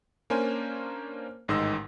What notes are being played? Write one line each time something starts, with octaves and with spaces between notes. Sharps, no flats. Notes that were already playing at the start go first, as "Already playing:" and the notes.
A#3 C#4 D4 A#4 C5 G#5
A1 G#2 D#3 D#5 C6 E6